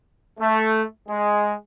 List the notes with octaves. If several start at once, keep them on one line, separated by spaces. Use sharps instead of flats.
A3
G#3